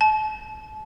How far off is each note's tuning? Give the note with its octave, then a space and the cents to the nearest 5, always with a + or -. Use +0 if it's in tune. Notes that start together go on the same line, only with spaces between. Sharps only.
A5 -35